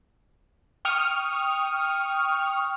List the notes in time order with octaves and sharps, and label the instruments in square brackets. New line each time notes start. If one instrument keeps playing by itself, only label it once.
[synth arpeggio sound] G5 C#6 D#6 F6